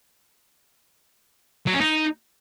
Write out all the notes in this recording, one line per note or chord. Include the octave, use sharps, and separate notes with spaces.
F#3
C#4
D#4